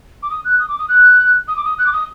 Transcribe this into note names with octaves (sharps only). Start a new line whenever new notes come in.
D6
D#6
F#6
D#6
D6
D#6
F#6
D#6
D6
D#6
F#6
D6
D#6